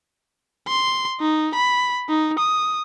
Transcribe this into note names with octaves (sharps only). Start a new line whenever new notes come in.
C6
D#4
B5
D#4
D#6